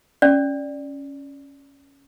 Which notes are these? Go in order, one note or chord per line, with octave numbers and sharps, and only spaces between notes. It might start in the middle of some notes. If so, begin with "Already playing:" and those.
C#4 D5